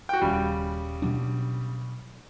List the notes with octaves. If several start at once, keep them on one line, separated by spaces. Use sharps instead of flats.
F#4 G5
D#1 C#3 G3
B2 F#3 D4